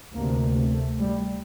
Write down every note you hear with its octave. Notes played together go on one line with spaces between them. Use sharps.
D2 C3 A#3
A3
G3